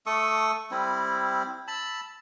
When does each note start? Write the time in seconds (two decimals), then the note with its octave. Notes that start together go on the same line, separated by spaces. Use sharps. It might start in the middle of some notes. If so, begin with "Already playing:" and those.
0.06 A3 A4 C#6 D#6
0.71 G3 C4 E4
1.68 A5 B5 E6